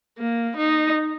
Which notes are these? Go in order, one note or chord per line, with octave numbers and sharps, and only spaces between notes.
A#3
D#4